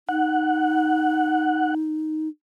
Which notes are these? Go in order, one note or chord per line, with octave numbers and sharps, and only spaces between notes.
D#4 F#5